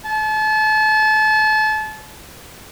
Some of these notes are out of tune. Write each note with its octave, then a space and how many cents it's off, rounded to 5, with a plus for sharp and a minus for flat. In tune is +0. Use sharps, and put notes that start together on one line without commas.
A5 -30